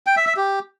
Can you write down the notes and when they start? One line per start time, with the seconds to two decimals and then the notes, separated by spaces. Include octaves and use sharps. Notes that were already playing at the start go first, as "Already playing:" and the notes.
0.07 G5
0.17 E5
0.27 E5
0.37 G4